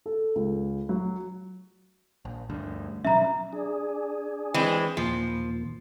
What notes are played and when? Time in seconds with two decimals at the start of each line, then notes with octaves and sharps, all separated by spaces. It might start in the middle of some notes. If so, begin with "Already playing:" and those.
0.06 A4
0.35 C#2
0.89 F#3
2.25 A#1
2.50 D2 G2
3.05 B2 F#3 C#4 E5 A#5
3.53 D4 G#4
4.54 E3 G#3 C4
4.97 D#2 A#2 F3